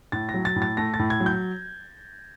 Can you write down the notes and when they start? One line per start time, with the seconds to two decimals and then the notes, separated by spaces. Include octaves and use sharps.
0.12 A2 A6
0.29 A#6
0.34 F#3
0.45 A6
0.56 A2
0.62 A6
0.77 A3 A#6
0.94 A6
0.99 A2
1.10 G#6
1.20 F#3
1.26 G6